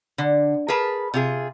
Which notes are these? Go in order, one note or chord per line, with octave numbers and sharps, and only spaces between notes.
D3
G#4 A#4 B4 A5
C3 F4 G#4